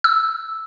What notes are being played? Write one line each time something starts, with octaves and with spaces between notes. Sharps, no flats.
E6